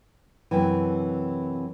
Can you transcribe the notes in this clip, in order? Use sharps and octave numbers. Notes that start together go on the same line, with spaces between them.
F#2 C3 E3